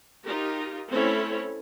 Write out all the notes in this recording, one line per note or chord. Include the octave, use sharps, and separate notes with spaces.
D#4 F4 G4 A#4
A3 C4 C#4 E4 A4 C#5